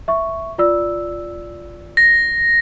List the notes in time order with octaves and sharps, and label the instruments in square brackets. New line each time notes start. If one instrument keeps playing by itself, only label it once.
[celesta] E5 C#6
F4 D5 E6
[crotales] A#6